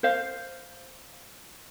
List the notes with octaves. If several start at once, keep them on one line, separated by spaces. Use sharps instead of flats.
C5 F5